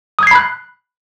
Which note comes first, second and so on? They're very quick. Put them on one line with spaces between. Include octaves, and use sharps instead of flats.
D#6 G#6 C7 B5 F#6